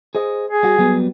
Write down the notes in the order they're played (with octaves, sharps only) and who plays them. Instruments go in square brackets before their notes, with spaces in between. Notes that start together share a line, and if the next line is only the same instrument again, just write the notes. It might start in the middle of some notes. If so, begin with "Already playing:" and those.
[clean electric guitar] G#4 C5 D#5
[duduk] G#4
[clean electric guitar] G3 F#4
F#3 G3 B3